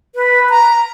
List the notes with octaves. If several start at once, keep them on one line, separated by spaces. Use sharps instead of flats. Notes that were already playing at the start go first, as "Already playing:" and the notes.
B4
A#5